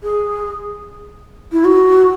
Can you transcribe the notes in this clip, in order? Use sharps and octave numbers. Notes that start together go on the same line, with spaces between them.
G#4
E4
F#4